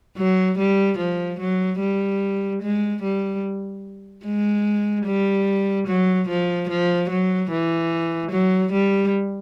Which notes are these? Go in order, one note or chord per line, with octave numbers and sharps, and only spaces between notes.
F#3
G3
F3
F#3
G3
G#3
G3
G#3
G3
F#3
F3
F3
F#3
E3
F#3
G3